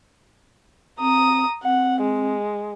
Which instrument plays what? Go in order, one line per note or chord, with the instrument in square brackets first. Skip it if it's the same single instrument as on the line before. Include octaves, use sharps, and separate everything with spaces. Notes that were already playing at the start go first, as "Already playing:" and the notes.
[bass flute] C4 [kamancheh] A#5 D#6
[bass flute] C4 [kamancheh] F#5
[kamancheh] G#3